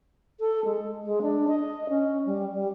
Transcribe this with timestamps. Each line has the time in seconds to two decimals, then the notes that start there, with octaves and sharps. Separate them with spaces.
0.40 A4
0.65 G#3
1.04 G#3
1.22 D4
1.48 D#5
1.89 C#4
2.26 G3
2.52 G3